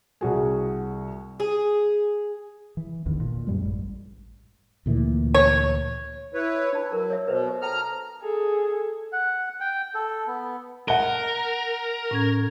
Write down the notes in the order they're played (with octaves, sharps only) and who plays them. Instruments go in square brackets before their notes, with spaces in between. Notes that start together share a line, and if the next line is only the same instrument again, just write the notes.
[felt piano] C2 F#4 G#4
[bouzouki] G#4
[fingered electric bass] E3
G#1 E2 D3 D#3
A#2
F#2 G3 G#3
A1
[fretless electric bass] D2 A#2 E3
[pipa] C#5
[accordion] E4 B4 C#5
[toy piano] D4 A5
[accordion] F#3 [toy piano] A#4
[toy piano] C#5 E5
[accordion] B2 [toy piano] B4 C5 E5
[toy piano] A4 G5 A5 [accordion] A#5 F6
[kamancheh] G#4 A4
[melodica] F#5
G5
A4
B3
[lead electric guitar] A#4 [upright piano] F#5 G7
[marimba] A2 C#4 G#6